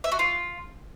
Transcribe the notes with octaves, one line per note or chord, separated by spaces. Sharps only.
E5
F#4
F4